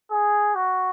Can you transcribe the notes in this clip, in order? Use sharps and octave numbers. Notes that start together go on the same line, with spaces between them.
G#4
F#4